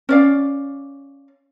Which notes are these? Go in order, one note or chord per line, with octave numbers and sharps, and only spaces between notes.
C#4 D5 F5